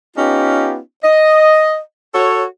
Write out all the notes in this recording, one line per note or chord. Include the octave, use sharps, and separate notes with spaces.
B3 C#4 D#4 F4 G4
D#5
F#4 A4 C#5